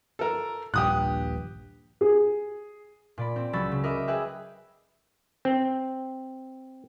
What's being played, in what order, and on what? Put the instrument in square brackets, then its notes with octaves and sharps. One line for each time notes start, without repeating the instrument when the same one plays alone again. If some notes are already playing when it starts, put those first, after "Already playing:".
[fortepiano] A4 A#4
[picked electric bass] D#1 A#1 G2 [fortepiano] G4 D#6 F#6
[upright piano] G#4
[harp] A#2 D5 B5
C4
C#2 F#3 C#4 B5 E6 A6
C#3
A#4 D#5 E5 B5 D6
G#4 B4 E5 G5
[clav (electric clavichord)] C4